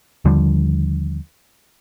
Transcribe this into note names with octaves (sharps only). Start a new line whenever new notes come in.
D#2 D3 F3 G3